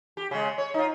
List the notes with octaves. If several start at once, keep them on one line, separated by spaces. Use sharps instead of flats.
G4
C#3 G#3
C#5
D#4 F4